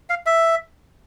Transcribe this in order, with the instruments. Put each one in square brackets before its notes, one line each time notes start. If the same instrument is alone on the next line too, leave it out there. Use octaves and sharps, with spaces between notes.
[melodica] F5
E5